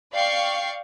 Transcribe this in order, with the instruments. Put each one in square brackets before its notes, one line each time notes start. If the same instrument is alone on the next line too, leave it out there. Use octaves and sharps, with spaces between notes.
[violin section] D5 F5 G5 C#6 C7